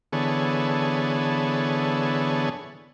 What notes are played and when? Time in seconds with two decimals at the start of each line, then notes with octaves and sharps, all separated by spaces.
0.13 D3 E3 B3 G#4 A4 C#5